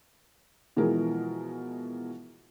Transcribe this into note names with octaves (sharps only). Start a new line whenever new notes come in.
B2 E3 F3 G#3 A#4